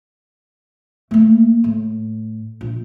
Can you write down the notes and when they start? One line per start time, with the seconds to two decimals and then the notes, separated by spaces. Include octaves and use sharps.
1.11 A3 A#3
1.64 A2
2.61 A#1